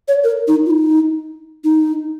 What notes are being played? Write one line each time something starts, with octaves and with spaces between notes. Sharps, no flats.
C#5
A#4
D#4
F4
D#4
D#4